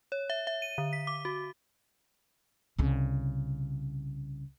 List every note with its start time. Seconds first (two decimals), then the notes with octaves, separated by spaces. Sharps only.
0.12 C#5
0.30 E5
0.47 E5
0.62 D#7
0.78 D3
0.93 B6
1.07 D6
1.25 F#4
2.78 C2 C#3